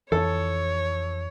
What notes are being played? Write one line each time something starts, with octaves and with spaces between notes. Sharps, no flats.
F2 E3 A4 C#5